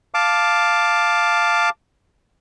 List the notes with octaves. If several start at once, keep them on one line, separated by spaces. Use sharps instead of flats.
F5 A5 D6